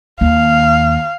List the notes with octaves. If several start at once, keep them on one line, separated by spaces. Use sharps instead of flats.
D#2 F5